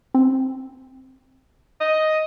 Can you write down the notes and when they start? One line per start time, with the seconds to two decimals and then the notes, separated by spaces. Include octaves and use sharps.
0.14 C4
1.80 D#5